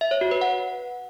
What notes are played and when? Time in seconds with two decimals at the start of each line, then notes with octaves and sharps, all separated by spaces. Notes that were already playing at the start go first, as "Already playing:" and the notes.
0.01 E5
0.11 C#5
0.21 F#4
0.31 B4
0.41 F#5